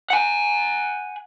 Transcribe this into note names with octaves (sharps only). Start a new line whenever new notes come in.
F#5 G#5